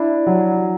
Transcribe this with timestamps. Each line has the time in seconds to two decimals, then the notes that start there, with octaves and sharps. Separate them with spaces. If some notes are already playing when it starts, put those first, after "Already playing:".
Already playing: D4 E4
0.26 F#3